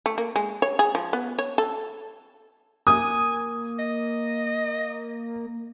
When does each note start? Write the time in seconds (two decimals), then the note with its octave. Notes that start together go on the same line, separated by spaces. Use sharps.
0.06 A3
0.18 A#3
0.36 G#3
0.62 C#5
0.79 G#4
0.95 F3
1.13 B3
1.39 C#5
1.58 A4
2.87 A#3 G#5 D#6
3.79 D#5